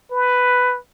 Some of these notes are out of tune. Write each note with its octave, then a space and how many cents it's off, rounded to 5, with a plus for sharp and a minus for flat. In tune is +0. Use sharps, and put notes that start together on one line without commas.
B4 +5